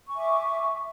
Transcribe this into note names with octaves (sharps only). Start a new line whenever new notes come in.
E5 G#5 C#6 D6